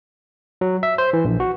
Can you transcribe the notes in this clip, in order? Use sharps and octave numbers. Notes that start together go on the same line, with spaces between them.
F#3
E5
C5
E3
A#1
F#4